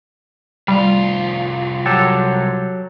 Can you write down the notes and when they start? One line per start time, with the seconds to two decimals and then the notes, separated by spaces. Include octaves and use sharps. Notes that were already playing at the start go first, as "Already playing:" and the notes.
0.68 C2 G3 F4
1.86 F#3 G4 A4